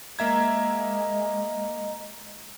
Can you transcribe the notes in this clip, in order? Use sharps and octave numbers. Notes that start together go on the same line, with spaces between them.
G#3 A#3 D#5 E5 A#5 G#6